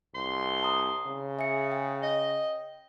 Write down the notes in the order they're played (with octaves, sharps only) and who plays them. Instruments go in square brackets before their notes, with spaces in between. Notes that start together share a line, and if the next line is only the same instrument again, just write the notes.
[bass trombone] C2 [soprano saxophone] C6
[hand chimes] A5 A#5 D#6
[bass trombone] C#3
[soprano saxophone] G#4 [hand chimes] E5 C#7
[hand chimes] G5
[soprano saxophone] D#5